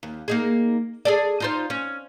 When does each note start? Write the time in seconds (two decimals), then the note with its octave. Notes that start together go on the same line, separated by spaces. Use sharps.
0.03 D#2
0.28 A#3 D#4 G#4
1.05 G#4 A4 D5
1.40 D#4 F4 C5
1.70 C#4